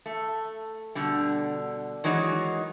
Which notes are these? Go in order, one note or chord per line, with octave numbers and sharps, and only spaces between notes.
A3
B2 D3 G3
D#3 E3 F#3 G#3 D#4